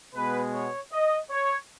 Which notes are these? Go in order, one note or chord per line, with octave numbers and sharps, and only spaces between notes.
B2 G#3 B3 B4
C#5
D#5
C#5